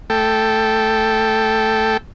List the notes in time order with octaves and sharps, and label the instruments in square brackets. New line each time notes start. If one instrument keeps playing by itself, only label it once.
[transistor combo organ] A3 A4 G5